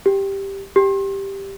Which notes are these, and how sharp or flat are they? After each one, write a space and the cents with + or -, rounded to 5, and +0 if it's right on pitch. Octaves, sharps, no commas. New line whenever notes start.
G4 +0
G4 +0